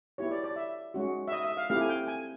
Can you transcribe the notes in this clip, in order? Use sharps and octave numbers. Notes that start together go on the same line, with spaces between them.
B3 E4 G4 C#5
D5
D5
E5
G#3 C#4 F#4
E5
D#5
E5
F5
A3 C4 E4 G4 F5
G#5
G5
G#5